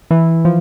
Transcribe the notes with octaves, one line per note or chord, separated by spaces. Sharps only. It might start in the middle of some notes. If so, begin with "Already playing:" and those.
E3
F3